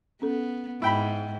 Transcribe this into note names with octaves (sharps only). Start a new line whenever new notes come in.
B3 C#4 A4
G#2 E4 G5 B5